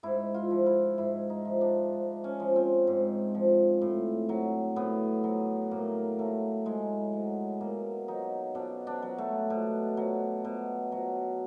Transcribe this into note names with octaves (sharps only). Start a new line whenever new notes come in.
G#2 E4
F4
F3
E4
G#2 E4
D#4
F3
D4
G#2
C#4
F3
C4
G#2
F3
A2
F#3
A2 B3
F#3
A2 A#3
F#3 A3
A2 G#3
F#3
B2 A#3
F#3 D#4
B2 D4
D4
F#3
A3
B2
F#3
B2
F#3